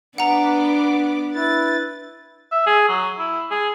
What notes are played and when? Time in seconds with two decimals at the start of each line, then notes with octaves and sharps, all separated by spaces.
0.18 B3 D4 F#5 A#5 D6
1.35 E4 B4 A6
2.52 E5
2.67 G#4
2.89 F#3
3.19 E4
3.51 G#4